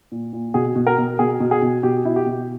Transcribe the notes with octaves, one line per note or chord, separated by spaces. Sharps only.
A#2
A#2
B2 G#4
B2
A#4
B2
B2 G#4
B2
G#4
B2
B2 G4
B2 E4
G4
B2